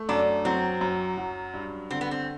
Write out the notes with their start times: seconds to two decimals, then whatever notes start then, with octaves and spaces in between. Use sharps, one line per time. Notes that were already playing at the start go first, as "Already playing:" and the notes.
Already playing: A3
0.09 F#2 D4
0.45 F#3 C4
0.81 F#2
1.17 F#3
1.54 G2
1.91 D3 C4
2.01 B3
2.11 C4